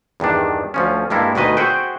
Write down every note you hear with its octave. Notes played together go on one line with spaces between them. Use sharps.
E2 G2 D#3 D4
D2 F3 C#4
G2 G#3 A#3 E4 A4
D2 B2 D#3 B4 D#5
F#4 G#4 C5 E5 F#5 G5